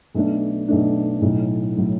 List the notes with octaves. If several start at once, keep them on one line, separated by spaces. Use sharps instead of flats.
B1 B2 A3 D4
B1 B2 A3 D4
B1 A2 F#3
A2 F#3